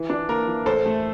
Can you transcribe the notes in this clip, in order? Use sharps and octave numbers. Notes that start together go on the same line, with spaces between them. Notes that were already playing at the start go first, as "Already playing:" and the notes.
Already playing: E3
D4
A#3 A#4
E3
A1 A4 C5
A3